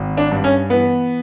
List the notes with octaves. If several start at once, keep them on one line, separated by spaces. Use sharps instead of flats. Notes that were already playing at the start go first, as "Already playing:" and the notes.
Already playing: G#1
D4
G2
C#4
E3 B3